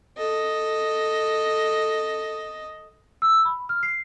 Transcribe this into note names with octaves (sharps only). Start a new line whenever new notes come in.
A4 D#5
E6
B5
F6
C7